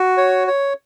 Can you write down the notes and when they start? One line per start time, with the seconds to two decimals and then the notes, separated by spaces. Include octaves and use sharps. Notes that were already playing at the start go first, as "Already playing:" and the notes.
Already playing: F#4
0.17 C#5
0.47 C#5